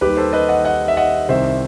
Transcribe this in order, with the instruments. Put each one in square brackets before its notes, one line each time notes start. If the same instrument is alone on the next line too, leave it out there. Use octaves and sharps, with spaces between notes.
[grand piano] D#2 D#3 G3 G4 B4
A4 C5
B4 D#5
D#5 F#5
D#5 F#5
E5
D#5 F#5
C2 C3 D#3 C5 E5